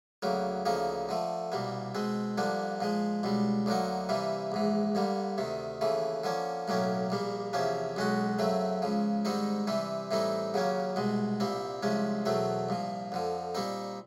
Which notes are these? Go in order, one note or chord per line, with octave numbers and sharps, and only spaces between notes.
D2 C#3 F#3 A#3
D2 C#3 F3 A#3 D#4
D3 F3 A3
C2 B2 G3 A#3
B2 G#3 C4
G2 D3 F3 A#3 D4
A#2 F3 G#3
C#2 B2 G3
D2 D3 F#3 A#3 D#4
C3 E3 G3 A#3
A#1 G#2 E3
G2 D3 G3 A#3
D2 C3 D#3
D#2 C#3 E3 A3
D3 F3 A#3 C#4
B1 A2 F#3 A#3 C#4
A#1 A#2 G3 A#3
E2 C3 F3 A#3 C#4
B1 B2 G#3 C#4 F#4
F#2 C#3 F#3 A3 C4
C#2 C#3 F3
G#2 D#3 G3 C4 D#4
C3 E3 G3 C4
A2 E3 G3 C4 D#4
D#2 C#3 F#3 A#3 C#4
C2 B2 G#3
C2 A#2 G3 C4
C2 C3 F3 G#3 C#4
E2 B2 F#3 A3 C4
C2 A#2 F3
F2 D3 F3
A#2 G3 C4 D#4